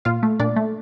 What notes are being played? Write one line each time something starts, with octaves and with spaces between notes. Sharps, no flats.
A#2 F4 F5
A3
A#2 D4 D5
A3